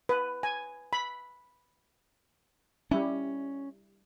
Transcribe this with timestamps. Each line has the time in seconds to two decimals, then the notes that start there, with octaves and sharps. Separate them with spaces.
0.09 B4
0.43 G#5
0.93 B5
2.91 G3 C#4 E4